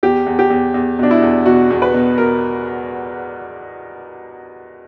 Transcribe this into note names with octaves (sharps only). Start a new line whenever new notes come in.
E2 G4
E2
G4
E2
E2
B2 D4
E4
E2
B2 F#4
E2
B4
B2
B2 A#4